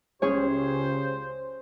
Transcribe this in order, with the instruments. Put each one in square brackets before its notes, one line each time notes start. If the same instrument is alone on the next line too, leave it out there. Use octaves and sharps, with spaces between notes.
[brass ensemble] C#2 C#3 G4 [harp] C#4 G#4 C#5 [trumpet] C5